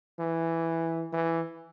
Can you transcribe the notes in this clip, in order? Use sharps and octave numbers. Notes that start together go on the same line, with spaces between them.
E3
E3